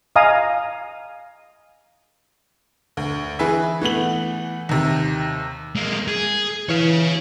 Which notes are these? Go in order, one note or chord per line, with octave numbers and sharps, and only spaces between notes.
D#5 F5 G#5 A#5 D#6
D2
E3 G#4 B4 E5
E3 A3 B3 F#7
D#2 C3
G#3 A#3
G#4
E3 C#5 F5